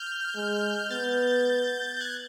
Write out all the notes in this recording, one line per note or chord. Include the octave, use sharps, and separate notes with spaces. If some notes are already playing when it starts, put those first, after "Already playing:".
Already playing: F6 G6
G#3
B3 G6 A6
G6
F#6 G#6